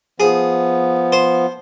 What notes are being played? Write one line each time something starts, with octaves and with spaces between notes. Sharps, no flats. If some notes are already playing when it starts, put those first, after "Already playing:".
F3 B3 G#4
C5